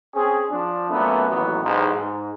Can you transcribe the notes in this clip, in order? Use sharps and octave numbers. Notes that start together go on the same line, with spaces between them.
C4 C#4 G#4
F3 D4
F#2 A#2 A3 B3
A1 D#2 E3 F#3 B3
B1 E2 G#2
G#2